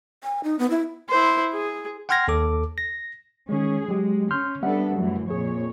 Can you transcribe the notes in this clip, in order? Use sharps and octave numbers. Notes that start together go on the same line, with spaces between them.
G#5
D#4
B3
E4
E4 C5
G#4
F#5 G5 C6 F6 G#6 A#6
D#2 A4 D6
A#6
D#3 G#3 C#4 G#4
F#3 G#3 G4
C#4 C6 F6 G6
G3 B3 D4 A4 E5 F#5
F#2 A2 E3
F2 A#2 G#4 C#5